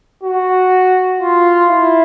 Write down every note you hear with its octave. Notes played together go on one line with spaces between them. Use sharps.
F#4
F4
E4